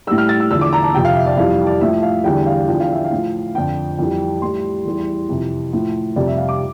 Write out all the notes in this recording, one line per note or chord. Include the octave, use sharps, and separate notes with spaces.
A2 G3 E6
F6
A6
E6
E2 D3 F3 E6
D6
A#5
A5
F2 C3 F3 G5
F5
E5
D5
F2 E3 G3 F5
D5
A2 F3 E5
F5
E2 D3 G3 G5
F5
E2 D3 F3 G5
F5
E5
F5
A2 F3
F2 D3 F3 G5
F2 E3 G3
A2 G3 C6
E2 E3 G3
F2 C3 E3
A2 F3
F2 C3 G3 D5
E5
F5
D6